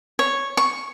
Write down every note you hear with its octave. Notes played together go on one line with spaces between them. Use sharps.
C#5
C#6